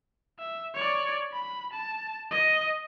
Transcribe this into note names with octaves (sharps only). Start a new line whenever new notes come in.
E5
C#5 D5
B5
A5
D#5